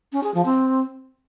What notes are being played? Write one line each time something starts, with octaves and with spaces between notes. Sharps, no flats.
C#4
G#4
F3
C4